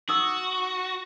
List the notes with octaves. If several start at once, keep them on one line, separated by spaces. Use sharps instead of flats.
D#4 F#4 D#6 E6